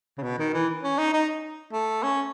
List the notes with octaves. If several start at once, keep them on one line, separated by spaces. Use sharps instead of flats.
C#3
B2
D#3
E3
C#4
D#4
D#4
A3
C#4